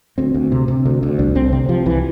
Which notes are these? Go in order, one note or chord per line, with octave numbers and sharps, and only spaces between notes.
D2 C4
D2
C3
C3
D2
D2
C2 D4
C2 C4
C3 C4
C3 F3
C2 E3